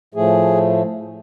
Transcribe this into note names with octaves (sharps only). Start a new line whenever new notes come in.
A2 F3 A3 G#4